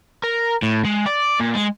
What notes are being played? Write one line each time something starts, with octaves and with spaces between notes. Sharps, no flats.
A#4
A2
G#3
D5
A#2
G#3